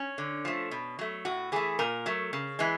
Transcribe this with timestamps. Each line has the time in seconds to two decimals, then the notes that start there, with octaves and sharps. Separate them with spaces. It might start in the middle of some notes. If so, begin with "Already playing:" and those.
Already playing: C#4
0.18 D3
0.45 F3 A3
0.71 B2
0.99 F#3 A3
1.25 A2 F#4
1.52 E3 A3 G#4
1.79 A#2 A#4
2.06 F#3 A3
2.33 C#3
2.59 E3 G#3